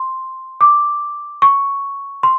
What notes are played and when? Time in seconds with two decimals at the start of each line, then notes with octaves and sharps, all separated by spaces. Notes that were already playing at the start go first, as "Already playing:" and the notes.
Already playing: C6
0.61 D6
1.42 C#6
2.23 C6